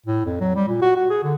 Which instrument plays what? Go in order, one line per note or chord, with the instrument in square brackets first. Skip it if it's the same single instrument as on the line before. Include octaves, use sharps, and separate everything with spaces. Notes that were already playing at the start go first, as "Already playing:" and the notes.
[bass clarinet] A2
F2
F#3
G3
A#2
F#4
F#4
G#4
D3